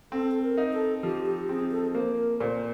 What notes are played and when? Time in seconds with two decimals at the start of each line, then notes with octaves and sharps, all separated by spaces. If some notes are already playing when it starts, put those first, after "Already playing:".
0.12 C4 A4
0.31 A4
0.42 A#4
0.57 D#4
0.73 A4
1.03 F3 G4
1.26 G4
1.48 C4 G#4
1.71 A4
1.95 A#3 C5
2.18 A#4
2.40 A#2 C5